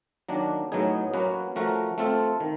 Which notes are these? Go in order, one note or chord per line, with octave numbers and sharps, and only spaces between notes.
D#3 F#3 A#3 D4
A2 F#3 B3 D#4 G#4
F#3 A#3 C#4 F#4 B4
F3 A3 C#4 F#4 A#4
A3 C4 F4 A4
D#3